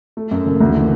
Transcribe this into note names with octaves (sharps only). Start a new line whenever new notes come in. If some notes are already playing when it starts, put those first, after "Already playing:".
A3
F#2
F#1
D2
E3